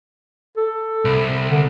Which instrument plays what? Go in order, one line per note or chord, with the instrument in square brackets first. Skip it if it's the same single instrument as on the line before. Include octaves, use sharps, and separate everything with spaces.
[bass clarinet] A4
[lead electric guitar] C2
[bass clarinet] D3